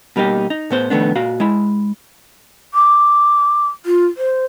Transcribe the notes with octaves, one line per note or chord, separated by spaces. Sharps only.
B2 G3 A#3 D#4 G4
D#4
A2 B3 C5
C2 F2 D#3 A3 B3 D4
A#2 F#4 F5
G#3 E4
D6
F4
C5